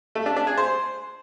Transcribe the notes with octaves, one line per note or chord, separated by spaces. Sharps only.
A3
D4
D4
G#4
C5